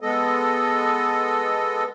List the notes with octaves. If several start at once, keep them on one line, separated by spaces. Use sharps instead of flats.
G#3 B3 A4 D#5